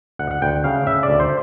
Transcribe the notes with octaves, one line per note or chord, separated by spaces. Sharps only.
D2 F#5
F#5
D2 G5
C#3 F5
C#3 E5
D5
D2
C5